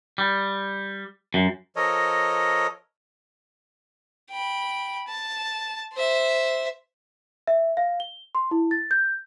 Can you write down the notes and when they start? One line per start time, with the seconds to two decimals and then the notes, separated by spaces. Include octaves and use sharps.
0.18 G3
1.34 F#2
1.76 F3 A4 A#4 C#5 D#5
4.31 G5 B5
5.08 A5
5.93 C5 E5
7.47 E5
7.77 F5
8.00 G7
8.35 C6
8.51 E4
8.71 A6
8.91 G6